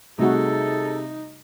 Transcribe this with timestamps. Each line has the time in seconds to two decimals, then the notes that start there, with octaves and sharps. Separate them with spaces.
0.18 C3 G3 A3 D#4 F#4 G#4 A4